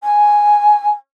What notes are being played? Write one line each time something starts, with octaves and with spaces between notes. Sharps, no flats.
G#5